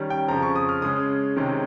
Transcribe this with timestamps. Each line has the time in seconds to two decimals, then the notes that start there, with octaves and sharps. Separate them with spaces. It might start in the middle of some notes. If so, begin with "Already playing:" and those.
Already playing: D#3 G3 C#4
0.10 G5
0.28 F2 C#3 F3 A#5
0.42 C#6
0.56 D#6
0.69 F6
0.82 C#3 G#3 C#4 D#6
1.36 C3 D#3 G#3 C#4